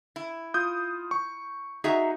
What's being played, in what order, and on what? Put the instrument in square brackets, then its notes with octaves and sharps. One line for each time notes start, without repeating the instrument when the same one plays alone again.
[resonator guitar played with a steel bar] E4
[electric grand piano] F4 D#6 G6
C#6
[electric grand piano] D#4 F#4 [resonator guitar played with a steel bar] G#4 E5 A#5